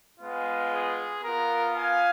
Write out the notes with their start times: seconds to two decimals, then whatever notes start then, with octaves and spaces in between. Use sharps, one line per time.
0.19 G#3 B3 F4
0.71 G#4
1.22 B3 F4 A#4
1.75 F5 G#5